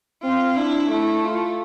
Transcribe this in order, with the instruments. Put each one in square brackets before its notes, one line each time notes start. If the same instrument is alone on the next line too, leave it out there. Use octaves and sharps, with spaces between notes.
[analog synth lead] C4 [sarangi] F4
[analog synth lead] D4 [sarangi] E4
[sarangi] A3 [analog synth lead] E4
[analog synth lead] F4